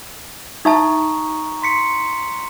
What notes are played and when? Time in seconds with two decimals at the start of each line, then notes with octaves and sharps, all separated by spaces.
0.65 D#4 E5 A5 A#5 C#6 D#6
1.62 C6 B6 C#7